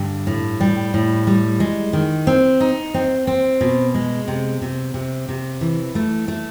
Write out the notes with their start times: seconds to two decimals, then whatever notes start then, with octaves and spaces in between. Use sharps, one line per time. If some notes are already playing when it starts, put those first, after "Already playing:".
Already playing: G2 D3
0.27 A2
0.60 G3
0.94 A2
1.27 G3
1.60 G#3
1.93 D#3
2.27 C4
2.61 D#4
2.94 C4
3.27 C4
3.61 B2
3.95 G#3
4.28 C3
4.62 C3
4.94 C3
5.28 C3
5.61 E3
5.95 A3
6.28 A3